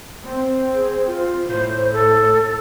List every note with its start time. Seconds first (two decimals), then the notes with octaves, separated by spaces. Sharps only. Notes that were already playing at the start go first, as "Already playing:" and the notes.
0.25 C4
0.74 G#4
1.07 F4
1.48 A2 C5
1.92 A4